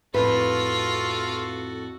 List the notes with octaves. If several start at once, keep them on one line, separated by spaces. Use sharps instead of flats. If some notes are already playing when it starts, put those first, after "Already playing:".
F2 A2 F4 F#4 A4 B4